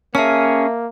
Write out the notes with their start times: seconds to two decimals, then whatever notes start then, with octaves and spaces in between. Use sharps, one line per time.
0.15 A#3 C#4 G#4 E5 A5 F6